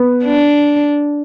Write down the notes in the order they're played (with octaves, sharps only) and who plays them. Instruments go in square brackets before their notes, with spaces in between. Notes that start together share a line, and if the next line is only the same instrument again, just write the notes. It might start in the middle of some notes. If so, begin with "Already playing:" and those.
Already playing: [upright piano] B3
[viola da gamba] D4